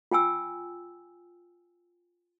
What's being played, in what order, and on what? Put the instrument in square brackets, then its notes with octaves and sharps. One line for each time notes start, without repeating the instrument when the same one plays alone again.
[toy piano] F4 G5 G#5 E6